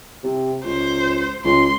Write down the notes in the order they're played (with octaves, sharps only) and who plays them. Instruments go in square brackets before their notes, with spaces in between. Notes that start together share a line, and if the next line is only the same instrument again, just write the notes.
[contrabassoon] C3
[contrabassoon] C#2 [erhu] C5
[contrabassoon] C#2 [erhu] C6